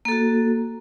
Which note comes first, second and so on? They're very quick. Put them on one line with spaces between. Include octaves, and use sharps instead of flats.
A#3 A4 F#4